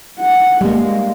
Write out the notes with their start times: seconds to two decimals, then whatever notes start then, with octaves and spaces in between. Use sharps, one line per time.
0.19 F#5
0.61 G3 G#3 A#3